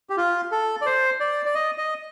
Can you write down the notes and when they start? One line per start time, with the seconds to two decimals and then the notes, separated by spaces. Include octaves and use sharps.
0.10 G4
0.17 F4
0.51 A4
0.81 D5
0.86 C5
1.20 D5
1.46 D5
1.55 D#5
1.78 D#5